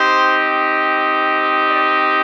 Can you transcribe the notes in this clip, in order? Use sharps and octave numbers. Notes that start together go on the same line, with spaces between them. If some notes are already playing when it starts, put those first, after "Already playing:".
Already playing: C4 D#4 G4 C5
D5